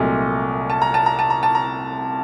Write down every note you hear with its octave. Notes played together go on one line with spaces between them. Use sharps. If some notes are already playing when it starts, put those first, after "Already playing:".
Already playing: C2 A#2 F#3 A3 D#5
A5
A#5
A5
A#5
A5
A#5
A5
A#5